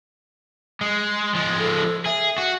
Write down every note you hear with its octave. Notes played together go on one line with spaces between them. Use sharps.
G#3
F3 G#3
A4
G#4 E5
F#4